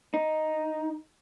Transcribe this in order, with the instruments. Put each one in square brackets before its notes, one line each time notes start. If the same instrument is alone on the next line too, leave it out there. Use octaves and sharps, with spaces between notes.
[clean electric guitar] D#4